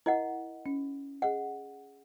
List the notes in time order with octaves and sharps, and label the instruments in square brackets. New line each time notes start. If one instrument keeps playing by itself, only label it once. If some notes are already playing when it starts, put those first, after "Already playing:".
[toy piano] E4 D#5 F#5 [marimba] A#4
[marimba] C#4
[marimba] G#4 D#5 [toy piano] F#5